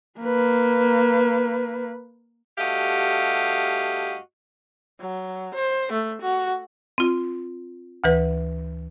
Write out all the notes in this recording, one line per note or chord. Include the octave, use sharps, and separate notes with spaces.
A#3 B4
G2 A3 F#4 G4 D#5 F5
F#3
C5
A3
F#4
C4 F4
D2 E3 B4